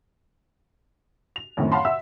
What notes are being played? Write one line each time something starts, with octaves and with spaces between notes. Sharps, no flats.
F7
F#2 A2 D#3 C4
C#5 F5 F#5 A5 B5 C6
E5 F#5 E6